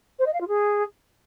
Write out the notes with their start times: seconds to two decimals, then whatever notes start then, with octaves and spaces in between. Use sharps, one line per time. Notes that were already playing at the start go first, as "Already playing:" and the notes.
0.19 C5
0.26 D#5
0.34 F5
0.41 F4
0.48 G#4